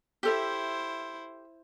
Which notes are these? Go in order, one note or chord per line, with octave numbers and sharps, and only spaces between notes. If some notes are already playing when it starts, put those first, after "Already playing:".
E4 G4 A4 C5 E5